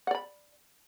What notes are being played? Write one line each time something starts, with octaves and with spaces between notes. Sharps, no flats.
D5 F#5 B5